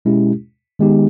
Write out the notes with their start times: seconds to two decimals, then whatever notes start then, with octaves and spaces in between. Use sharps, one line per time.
0.05 B2 G#3 C#4 E4 G4
0.79 D#3 G#3 B3 D#4 G4